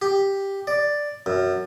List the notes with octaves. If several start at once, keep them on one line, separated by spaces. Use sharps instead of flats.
G4
D5
F#2